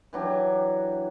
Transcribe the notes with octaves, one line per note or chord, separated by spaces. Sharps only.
E3 F#3 D4 G4